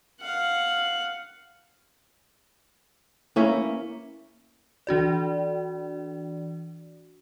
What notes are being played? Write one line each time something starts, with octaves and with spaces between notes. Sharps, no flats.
F5 F#5
A#3 C#4 E4 E5
E3 D4 F#4 D5